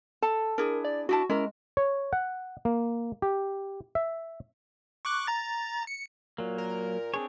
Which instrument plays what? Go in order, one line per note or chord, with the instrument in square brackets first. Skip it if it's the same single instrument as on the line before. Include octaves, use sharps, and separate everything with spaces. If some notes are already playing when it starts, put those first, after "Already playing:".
[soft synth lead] A4 [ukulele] A5
[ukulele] D4 E4 G#4 [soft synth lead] A#4
[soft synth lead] D5
[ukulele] D4 E4 A5 [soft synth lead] F#4
[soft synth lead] G#3 [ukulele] C#4 E4 A#4
[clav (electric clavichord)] C#5
F#5
A#3
G4
E5
[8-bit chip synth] C#6 D6 F#6
A#5 A6
C#7
[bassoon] A#2 [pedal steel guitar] F#3 A#3
[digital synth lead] A#4
[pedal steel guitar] C4 D4 C#5 [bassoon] G#4